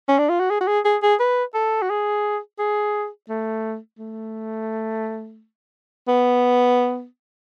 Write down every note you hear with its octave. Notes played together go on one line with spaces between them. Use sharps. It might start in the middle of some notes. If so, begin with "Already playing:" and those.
C#4
D4
F4
F#4
G#4
F#4
G#4
G#4
G#4
B4
A4
F#4
G#4
G#4
A3
A3
B3